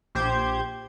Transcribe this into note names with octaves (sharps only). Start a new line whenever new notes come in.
A#1 G4 C5 G6 G#6